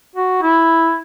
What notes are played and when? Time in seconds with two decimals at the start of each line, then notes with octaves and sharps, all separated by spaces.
0.16 F#4
0.42 E4